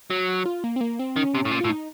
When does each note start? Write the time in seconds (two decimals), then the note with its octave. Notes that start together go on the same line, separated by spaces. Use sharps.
0.10 F#3
0.46 F4
0.64 A#3
0.76 C4
0.81 A#3
0.99 C4
1.16 D#3 C#4
1.35 C3
1.45 A2
1.52 A#2
1.61 A2 F4
1.69 D#4